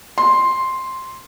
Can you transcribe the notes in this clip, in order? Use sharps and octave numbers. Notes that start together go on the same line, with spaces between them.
C6